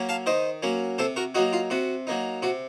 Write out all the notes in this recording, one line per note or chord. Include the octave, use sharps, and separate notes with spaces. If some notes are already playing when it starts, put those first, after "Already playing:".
Already playing: F#3 A#3 C#4
F5 A5
D#3 C5 D#5
F#3 A#3 C#4
C3 A4 C5
F#4 A#4
F#3 A#3 D#4 F#4
F4
C3 F#4
F#3 A#3 D#4
C3 F#4